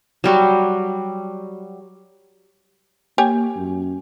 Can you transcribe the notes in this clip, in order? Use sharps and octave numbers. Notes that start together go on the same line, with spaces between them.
F#3 G3 F#4
A#3 G4 C#5 G#5
F#2